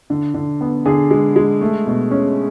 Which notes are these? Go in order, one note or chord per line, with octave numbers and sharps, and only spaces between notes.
D3
D3
B3
D3 G#4
G#3
G#3
A3
B2
C#4